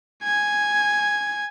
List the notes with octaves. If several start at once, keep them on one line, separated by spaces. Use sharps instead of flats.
G#5 G#6